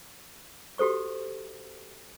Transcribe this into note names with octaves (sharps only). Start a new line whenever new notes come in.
F#4 G4 A4 C5 C#6